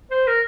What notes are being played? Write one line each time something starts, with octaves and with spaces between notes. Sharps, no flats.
C5
A#4